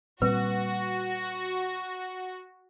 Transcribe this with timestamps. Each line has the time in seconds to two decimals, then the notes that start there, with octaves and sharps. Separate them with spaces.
0.22 A#2 G3 C4 F#4 B4